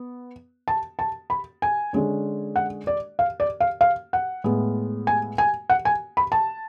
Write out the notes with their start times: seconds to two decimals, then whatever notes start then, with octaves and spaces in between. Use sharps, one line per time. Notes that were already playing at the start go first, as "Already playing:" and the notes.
Already playing: B3
0.68 A5
0.99 A5
1.30 B5
1.62 G#5
1.93 D3 G#3 C#4
2.56 F#5
2.87 D5
3.19 F5
3.40 D5
3.60 F5
3.81 F5
4.13 F#5
4.44 A2 G#3 B3
5.07 G#5
5.38 G#5
5.70 F#5
5.85 G#5
6.17 B5
6.32 A5